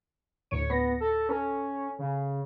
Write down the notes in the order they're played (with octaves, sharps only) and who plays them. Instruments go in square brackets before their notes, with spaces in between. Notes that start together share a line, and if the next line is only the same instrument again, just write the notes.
[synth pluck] D2 A2 C#7 [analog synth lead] C#5
[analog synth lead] B3 [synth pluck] A#6
[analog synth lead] A4
[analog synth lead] C#4 [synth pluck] A4
[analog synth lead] C#3